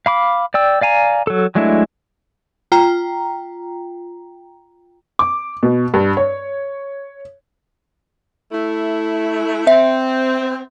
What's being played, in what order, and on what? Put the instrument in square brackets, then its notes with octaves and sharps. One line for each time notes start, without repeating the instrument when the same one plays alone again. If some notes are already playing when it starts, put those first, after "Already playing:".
[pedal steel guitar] F5 B5 D6
D5 G5 E6
D5 F5 G#5 A#5
F#3 A4
F#3 G#3 A3 D4 E4
[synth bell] F4 G5 A#5
[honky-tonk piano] D6
B2
G2
C#5
[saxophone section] A3 E4
[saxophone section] C4 [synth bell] E5